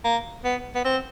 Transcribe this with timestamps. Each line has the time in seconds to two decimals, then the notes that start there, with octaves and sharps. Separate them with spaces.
0.04 A#3
0.45 B3
0.75 B3
0.85 C4